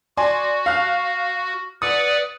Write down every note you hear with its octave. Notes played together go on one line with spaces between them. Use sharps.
F#4 D5 G#5 C6
F5 F6 F#6
B4 D5 F#5 D#6